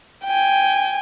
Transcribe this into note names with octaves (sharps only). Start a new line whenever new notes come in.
G5 G#5